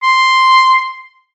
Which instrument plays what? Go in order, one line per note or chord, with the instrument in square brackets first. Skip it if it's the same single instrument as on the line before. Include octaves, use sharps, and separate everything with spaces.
[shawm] C6